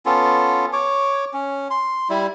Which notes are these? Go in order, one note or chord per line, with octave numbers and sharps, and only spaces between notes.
B3 C#4 F4 A4
C#5 D6
C#4
C6
G3 E4